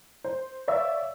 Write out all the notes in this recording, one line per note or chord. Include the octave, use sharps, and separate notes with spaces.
C5
C#5 D5 E5 F5 E6